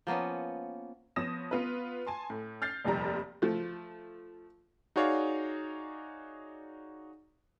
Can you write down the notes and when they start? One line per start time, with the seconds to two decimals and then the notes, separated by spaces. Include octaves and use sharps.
0.07 F3 A#3 B3 C#4
1.16 F3 B3 C#5 D#6 A#6 E7
1.51 B3 F4 B4
2.07 G#5 A5 C6
2.30 A2
2.62 F6 G6 A6 C7
2.84 F1 A#1 D#2 F3 G3 A#5
3.42 F3 A3
4.96 D#4 F#4 G#4 C#5 D5 F5